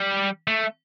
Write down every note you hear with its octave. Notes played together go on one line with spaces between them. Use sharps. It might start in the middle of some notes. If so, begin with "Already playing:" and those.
Already playing: G3
A3